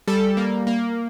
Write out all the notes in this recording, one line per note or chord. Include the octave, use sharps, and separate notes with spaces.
G3 A4
A#3
A#3